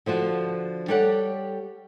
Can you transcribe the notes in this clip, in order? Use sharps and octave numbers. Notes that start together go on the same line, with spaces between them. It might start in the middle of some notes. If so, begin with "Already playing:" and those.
D3 F3 F4 F#4
G3 G4 A4 C#5 F#5